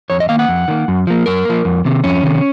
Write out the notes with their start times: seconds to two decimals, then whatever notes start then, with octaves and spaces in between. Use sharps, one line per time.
0.10 F2 C#5
0.20 D#5
0.29 D#3 A#3 F5
0.39 F#5
0.48 F2
0.68 D#3 A#3
0.88 F#2
1.07 F3 A#3
1.26 F#2 A#4
1.45 F3 A#3
1.65 F2
1.85 C3 D#3
2.04 F2 C#4
2.23 C3 D#3